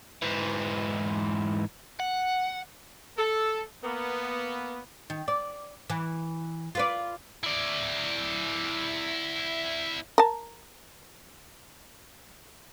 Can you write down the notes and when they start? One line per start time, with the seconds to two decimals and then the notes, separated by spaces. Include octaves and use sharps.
0.22 G#2 E3
2.00 F#5
3.17 A4
3.83 A#3 B3
5.10 D#3
5.28 D5
5.90 E3
6.75 F4 B4 D5
7.43 E4 D5
10.18 A#4 A5